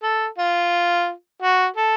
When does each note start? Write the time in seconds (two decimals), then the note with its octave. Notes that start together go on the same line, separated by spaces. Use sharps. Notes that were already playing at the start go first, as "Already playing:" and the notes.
0.03 A4
0.38 F4
1.42 F#4
1.76 A4